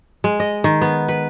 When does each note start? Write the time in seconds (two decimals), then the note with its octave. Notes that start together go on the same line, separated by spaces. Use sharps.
0.24 G#3
0.40 D#5
0.64 D#3
0.81 B3
1.08 B4